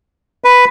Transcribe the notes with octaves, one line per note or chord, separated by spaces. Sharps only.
B4